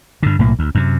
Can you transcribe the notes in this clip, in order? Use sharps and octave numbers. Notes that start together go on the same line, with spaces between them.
G2 D3
B1 A2 A#3
D2
F#2 C3